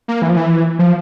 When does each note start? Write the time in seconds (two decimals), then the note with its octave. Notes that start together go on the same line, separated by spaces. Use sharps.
0.08 A#3
0.22 E3
0.30 F3
0.37 E3
0.79 F3